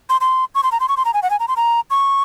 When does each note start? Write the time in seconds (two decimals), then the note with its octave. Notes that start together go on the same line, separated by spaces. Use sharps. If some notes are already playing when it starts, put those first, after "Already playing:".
0.09 C6
0.21 C6
0.55 C#6
0.63 C6
0.72 A#5
0.80 C6
0.89 C#6
0.97 C6
1.05 A#5
1.14 G#5
1.22 F#5
1.30 G#5
1.40 A#5
1.48 C6
1.56 A#5
1.90 C#6